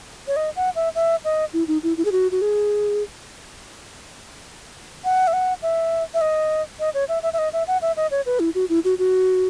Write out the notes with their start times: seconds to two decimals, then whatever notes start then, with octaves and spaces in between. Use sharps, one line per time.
0.27 C#5
0.36 D#5
0.56 F#5
0.75 E5
0.95 E5
1.25 D#5
1.53 E4
1.68 D#4
1.83 E4
1.97 E4
2.05 G#4
2.12 F#4
2.32 F#4
2.42 G#4
5.05 F#5
5.27 E5
5.33 F#5
5.63 E5
6.14 E5
6.21 D#5
6.80 D#5
6.94 C#5
7.09 E5
7.23 E5
7.33 E5
7.39 D#5
7.53 E5
7.67 F#5
7.82 E5
7.97 D#5
8.11 C#5
8.26 B4
8.40 E4
8.55 F#4
8.69 E4
8.85 F#4
8.99 F#4